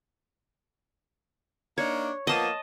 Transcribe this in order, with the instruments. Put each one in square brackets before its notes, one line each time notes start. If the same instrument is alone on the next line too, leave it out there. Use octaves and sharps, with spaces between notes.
[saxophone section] A#3 D4 D#4 [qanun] C#5
[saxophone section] F3 A#3 B3 [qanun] D#5 A5